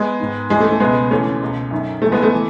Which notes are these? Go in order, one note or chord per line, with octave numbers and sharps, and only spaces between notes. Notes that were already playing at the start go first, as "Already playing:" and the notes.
Already playing: G#3 B3
G#2 D#3
C#2 C#3 E3 G#3
A3
A3
C#2 B2 G#3 B3
D#2 C#3 E3 A3 C#4
C#2 B2
F#2 D#3
C#2 C#3 E3 A3
G#3 B3
A3
E3